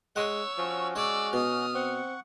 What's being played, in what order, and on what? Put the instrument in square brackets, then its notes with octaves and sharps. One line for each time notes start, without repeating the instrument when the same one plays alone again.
[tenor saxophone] G#3 [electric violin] C#5 E6 [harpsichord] F#5
[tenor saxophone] F3 [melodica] C#4 F#4
[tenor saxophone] G#3 [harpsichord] C#5 [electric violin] D5 E6
[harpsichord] B2 [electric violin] D#6 F6
[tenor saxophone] C4 [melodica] F#5 C#6